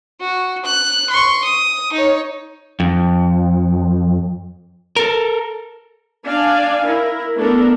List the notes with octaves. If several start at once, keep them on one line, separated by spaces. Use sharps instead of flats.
F#4
F#6
C6 C#6
D#6
D#4 C#5
F2
A4 A#4
D4 D5 F5 G#5
E4 A#4
A3 B3 D4 A4 A#4